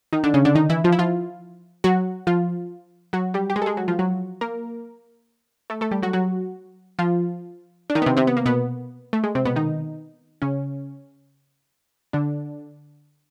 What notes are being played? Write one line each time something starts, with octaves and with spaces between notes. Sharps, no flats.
D#3 D#4
D3 D4
C#3 C#4
D3 D4
D#3 D#4
E3 E4
F3 F4
E4
F3 F4
F#3 F#4
F3 F4
F#3 F#4
G3 G4
G4
G#3 G#4
A4
G#3 G#4
F#3 F#4
F3 F4
F#3 F#4
A#3 A#4
A3 A4
A3 A4
G3 G4
F#3 F#4
F#3 F#4
F3 F4
D4
D#3 D#4
B3
C3 C4
C3 C4
B3
A#3
B2 B3
A3
G#3
C3 C4
B2 B3
D#3 D#4
C#3 C#4
D3 D4